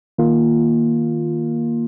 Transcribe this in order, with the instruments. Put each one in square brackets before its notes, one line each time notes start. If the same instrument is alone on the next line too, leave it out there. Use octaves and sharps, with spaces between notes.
[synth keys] D#3 A#3 F4